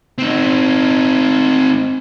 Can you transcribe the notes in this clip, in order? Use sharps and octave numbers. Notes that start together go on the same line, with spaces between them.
C4 D#4